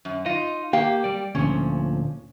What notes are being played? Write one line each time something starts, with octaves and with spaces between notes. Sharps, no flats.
F#2
D#4 F4 D#5
A#3 G4 F5 G5
G3 D5
D2 A#2 F3 C#4